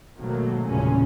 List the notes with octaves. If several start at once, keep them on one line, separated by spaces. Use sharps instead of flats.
G#1 B2 D#3 F#3 A3 A#3
G1 E2 A#2 C#3 C#4